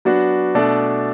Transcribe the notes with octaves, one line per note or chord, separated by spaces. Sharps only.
F#3 B3 D4 F#4
B2 A3 D4 A4 D5